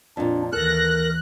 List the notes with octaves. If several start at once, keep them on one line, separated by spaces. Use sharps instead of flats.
F2 A#2 D4
D#2 E3 A4 A#4 F#6 A#6